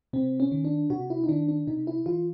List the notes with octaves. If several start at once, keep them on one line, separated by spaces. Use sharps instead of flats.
C3 C4
C#4
D#3
D4
C3 F#4
E4
D#4
D#3 D4
D4
C3 D#4
E4
E3 F4